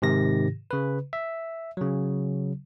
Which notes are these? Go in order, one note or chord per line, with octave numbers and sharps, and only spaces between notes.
G#2 C3 D#3 G4 A#6
C#3 B4
E5
C#3 F#3